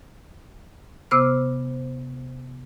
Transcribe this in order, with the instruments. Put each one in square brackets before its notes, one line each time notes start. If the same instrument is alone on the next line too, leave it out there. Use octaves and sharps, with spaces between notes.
[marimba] C3 B3 C5 D6 E6 F6